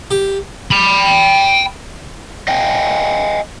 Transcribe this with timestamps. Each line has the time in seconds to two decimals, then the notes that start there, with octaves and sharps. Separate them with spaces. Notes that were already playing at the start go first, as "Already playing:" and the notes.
0.11 G4
0.71 G5 B5
2.48 D#5 F5 G5 G#5